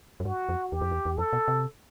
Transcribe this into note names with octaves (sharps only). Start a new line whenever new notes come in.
F#2
G2 F#4
F2
E2 G4
F2
E2
E2
F2 A4
B2
C3